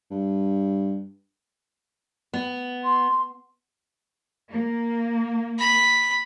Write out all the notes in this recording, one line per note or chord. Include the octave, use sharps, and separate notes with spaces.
G2
B3
C6
A#3
B5